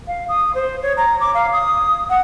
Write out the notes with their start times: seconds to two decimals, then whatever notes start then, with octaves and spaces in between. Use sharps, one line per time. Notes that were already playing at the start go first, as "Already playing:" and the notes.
0.07 F5
0.28 D#6
0.54 C5
0.82 C#5
0.97 A#5
1.20 D6
1.34 F5
1.53 D#6
2.09 F#5